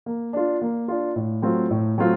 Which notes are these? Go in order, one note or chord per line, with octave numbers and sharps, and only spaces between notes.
A#3
D4 F4
A#3
D4 F4
A2
F#3 A3 C4 F4
A2
F#3 A3 C4 F4